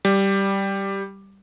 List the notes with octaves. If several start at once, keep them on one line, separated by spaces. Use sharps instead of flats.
G3